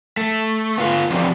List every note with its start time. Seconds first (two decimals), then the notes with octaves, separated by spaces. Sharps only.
0.17 A3
0.78 B3 F4
1.11 E2 F3 F#3 C4 G4 D5